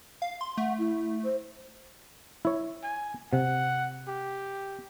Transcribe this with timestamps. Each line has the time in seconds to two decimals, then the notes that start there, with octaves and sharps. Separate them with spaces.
0.22 F5
0.41 C6
0.58 A3 F#5
0.79 E4
1.24 C5
2.45 E4 C#5
2.84 G#5
3.33 C3 F#5
4.08 G4